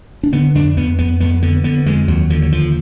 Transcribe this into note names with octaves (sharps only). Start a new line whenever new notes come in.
D4
D3 B3
F2 D4
F2 B3
F2 B3
F2 B3
D3 B3
D3 B3
F2 G#3
D#2 F#3
D3 F3
F#3
D#2 F3